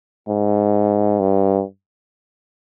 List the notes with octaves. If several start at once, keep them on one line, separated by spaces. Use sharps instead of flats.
G#2
G2